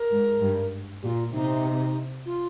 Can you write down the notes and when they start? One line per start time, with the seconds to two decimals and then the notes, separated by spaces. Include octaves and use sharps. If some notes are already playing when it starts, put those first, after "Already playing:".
Already playing: A#4
0.11 G#2
0.41 G2
1.02 A#2 F4 G4
1.33 C3 D#4
2.25 F4